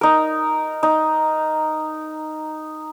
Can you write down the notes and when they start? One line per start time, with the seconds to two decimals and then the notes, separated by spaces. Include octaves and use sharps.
0.01 D#4 A#4
0.83 D#4